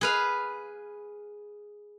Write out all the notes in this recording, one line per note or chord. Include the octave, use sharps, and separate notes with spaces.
G#4 B4 F5